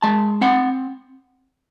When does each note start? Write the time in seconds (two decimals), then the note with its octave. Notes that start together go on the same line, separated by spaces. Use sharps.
0.02 G#3 A5
0.41 C4 F#5